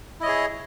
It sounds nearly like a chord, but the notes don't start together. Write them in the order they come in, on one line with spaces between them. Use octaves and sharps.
E4 D#5 C#5 G#4